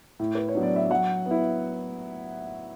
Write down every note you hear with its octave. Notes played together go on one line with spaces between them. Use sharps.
A2
B4
C#5
F#3 B3 D4
D5
E5
F#3 F#5
B3
E4